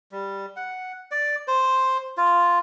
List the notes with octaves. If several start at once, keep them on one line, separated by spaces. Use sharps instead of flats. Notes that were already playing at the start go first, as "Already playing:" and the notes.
G3
F#5
D5
C5
F4